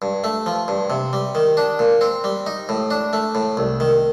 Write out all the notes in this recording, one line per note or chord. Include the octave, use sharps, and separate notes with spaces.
G2
A3
F3
G2
C3
G3
D#3
D4
A#2
C4
G3
D#4
A2
D4
A3
A2
C2
D#3